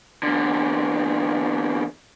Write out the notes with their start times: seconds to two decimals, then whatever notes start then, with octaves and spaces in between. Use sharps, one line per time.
0.23 E2 D3